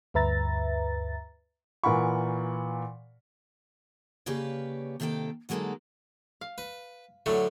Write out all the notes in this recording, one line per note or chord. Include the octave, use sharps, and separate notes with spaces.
D2 G2 B4 E5 A#5 A6
A#2 E3 A#4 F#5 B5 C#6
C#3 A#3 G4 B4 C#5 D5
C3 D#3 A#3 A4 G5
D3 F#3 G#3 A#3 D#4 A4
F5
B4
A2 D3 F#3 A3